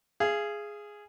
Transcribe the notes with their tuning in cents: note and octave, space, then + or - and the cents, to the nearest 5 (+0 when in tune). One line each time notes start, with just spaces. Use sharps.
G#4 +0 F5 -35